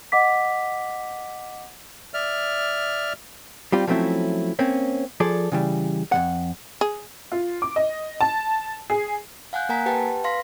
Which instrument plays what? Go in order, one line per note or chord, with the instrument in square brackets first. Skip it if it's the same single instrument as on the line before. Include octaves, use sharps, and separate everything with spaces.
[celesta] D#5 F#5 D6 B6
[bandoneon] D5 E5 F6
[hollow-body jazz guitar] G3 C4 F4 G4
F3 F#3 A3 C4 C#4 E4
A#3 C4 C#4
F3 G#4 A4 D5
C#3 E3 G3
F2 E3 F#5
[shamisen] G#4
[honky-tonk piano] F4
D6
D#5
A5
G#4
[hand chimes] F5 F#5 G#5 F#6 G6
A#3 A#4 F#5 G#5 A#5 B6
G4 B4 F#5 G5 A5
B4 F5 C6 A#6 B6